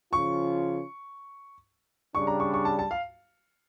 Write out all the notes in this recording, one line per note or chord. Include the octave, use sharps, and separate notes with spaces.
C#3 F3 C#4 F4 C#6
C#3 G3 D4 C#6
A#5
C#6
C#6
A5
A5
F5